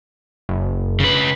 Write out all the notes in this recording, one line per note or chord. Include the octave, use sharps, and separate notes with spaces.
F#1
C#3 B4